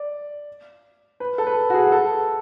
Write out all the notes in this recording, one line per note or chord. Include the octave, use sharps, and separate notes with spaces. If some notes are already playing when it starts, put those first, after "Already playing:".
Already playing: D5
B4
A4
B4
F#4
G#4
A4